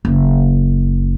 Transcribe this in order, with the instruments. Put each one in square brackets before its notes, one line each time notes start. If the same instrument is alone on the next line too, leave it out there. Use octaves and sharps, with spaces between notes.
[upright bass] F#1